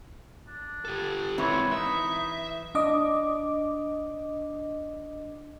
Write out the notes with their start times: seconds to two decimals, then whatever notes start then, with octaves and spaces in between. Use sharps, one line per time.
0.47 D4
0.85 G4 A4
1.38 E3 G#3 C4 C#5
1.72 D#4 E5
2.75 D4 D#5 D6